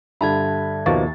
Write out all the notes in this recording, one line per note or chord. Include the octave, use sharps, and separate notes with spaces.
G2 D3 E5 A5 B5 G#6
D#2 B2 F3 A#3 C#6 A6